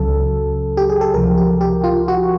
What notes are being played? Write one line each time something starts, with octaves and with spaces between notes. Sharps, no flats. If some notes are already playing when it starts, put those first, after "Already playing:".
Already playing: C#2 C#3 F#3 A4
G4
G#4
A4
C#2 C3 F3 A#4
G4
G4
F4
F#4